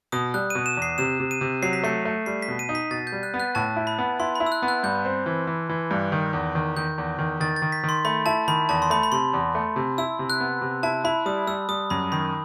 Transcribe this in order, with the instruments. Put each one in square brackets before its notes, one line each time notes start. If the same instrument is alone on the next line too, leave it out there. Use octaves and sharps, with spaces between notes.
[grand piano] B2 [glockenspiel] D#6
[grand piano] G3 [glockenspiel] F#6
[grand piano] B2 [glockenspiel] D#7
[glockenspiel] E7
[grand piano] E2
[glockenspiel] C7
[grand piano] C3 [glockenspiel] E7
[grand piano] C3
[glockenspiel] D#7
[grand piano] C3
[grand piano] F#3 [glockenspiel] C7
[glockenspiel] B6
[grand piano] A3 [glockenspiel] C7
[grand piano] A3
[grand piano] G3 [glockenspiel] C7
[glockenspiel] B6
[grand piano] B2
[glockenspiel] D#7
[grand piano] D#4
[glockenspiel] B6
[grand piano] B2 [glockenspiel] A6
[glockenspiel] G6
[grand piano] G3
[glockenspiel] F#6
[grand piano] B3
[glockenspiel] F#6
[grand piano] A2 [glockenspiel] A5
[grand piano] E4
[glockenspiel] B5
[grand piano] B3
[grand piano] E4 [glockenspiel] C6
[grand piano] E4 [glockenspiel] B5
[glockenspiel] E6
F#6
[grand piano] B3
[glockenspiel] F#6
[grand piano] G2 [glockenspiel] G6
[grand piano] C4
E3
E3
E3
G2
D#3
E2
D#3
[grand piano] D#3 [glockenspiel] G6
[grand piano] E2
D#3
[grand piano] D#3 [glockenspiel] A6
[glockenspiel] A6
[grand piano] D#3
[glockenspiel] B6
[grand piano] D#3
[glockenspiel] C6
[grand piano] A3 [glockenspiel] B5
[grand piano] E4 [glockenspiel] A5
[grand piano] D#3 [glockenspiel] B5
[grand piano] E2 [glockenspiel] A5
[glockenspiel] C6
[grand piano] A3 [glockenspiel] B5
[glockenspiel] B5
[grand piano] C3 [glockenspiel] C6
[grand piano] E2
A3
C3
[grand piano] E4 [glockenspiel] E6
[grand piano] C3
[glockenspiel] F#6
[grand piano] B3
C3
[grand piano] E4 [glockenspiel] A5
[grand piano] E4 [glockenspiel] B5
[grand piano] G3 [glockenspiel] D#6
[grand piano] G3 [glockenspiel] E6
[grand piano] G3 [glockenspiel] D#6
[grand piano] F#2 [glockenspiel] B5
[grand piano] D#3 [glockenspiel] B5